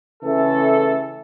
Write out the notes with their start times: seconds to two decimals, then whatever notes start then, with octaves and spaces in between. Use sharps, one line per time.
0.23 C#3 E3 A3 A4